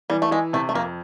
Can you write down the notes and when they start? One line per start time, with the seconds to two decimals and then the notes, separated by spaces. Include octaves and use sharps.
0.10 E3 G3
0.22 A3
0.31 E3 G#3
0.53 C3 A3
0.69 A3
0.74 F2 A#3